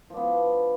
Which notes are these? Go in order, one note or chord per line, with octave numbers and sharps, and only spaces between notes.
F3 B3 D4